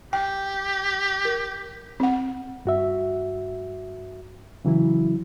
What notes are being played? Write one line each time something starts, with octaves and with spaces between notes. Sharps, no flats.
G4 G5
A#4
C4 F#5
G2 F#4 E5
C#3 E3 F#3 E4